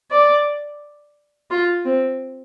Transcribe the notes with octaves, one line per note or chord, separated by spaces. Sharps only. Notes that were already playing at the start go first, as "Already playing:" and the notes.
D5
F4
C4